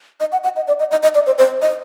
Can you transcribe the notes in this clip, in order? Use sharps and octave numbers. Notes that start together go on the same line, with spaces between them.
D#5
F#5
F#5
D#5
D5
D#5
D#5
D#5
D5
C5
C5
D#5